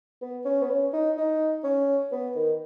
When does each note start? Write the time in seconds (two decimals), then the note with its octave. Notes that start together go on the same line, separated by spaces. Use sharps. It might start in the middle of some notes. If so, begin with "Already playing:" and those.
0.22 B3
0.45 C#4
0.62 B3
0.70 C#4
0.93 D#4
1.18 D#4
1.64 C#4
2.12 B3
2.36 D#3